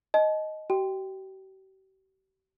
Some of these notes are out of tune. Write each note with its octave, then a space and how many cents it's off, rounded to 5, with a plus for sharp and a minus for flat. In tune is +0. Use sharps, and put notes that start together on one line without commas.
D#5 +0 A5 -35
G4 -45 G5 +0